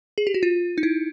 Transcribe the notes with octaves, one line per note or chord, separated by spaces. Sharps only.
G#4
G4
F#4
F4
D#4
E4